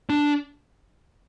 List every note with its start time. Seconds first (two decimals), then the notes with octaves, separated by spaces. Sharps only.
0.10 D4